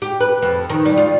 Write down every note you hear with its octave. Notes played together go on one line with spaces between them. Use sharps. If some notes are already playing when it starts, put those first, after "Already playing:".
G4
B4
F2
D#3
G3
F4